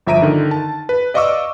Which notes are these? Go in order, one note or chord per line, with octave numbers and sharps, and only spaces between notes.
G1 F3 E5 A#5 D7 D#7
D3 D#3
A5
B4
D5 D#5 F5 C#6 D6 E6